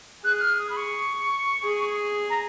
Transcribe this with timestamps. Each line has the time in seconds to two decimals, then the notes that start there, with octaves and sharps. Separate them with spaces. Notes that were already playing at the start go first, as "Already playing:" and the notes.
0.24 G#4 F#6
0.36 F#6
0.41 F6
0.59 D#6
0.70 B5
0.77 C#6
1.64 G#4
2.30 A#5